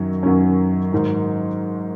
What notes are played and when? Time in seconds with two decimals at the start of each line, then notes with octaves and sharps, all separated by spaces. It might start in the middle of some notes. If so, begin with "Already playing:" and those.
Already playing: F#2 D#3 F#3 C#4
0.23 F#2 D#3 F#3 C#4
0.92 G#2 D#3 F#3